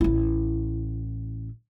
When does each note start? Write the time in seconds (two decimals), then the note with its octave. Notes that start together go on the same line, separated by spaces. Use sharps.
0.01 A1 E4